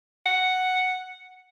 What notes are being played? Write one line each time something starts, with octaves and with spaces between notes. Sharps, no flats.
F#5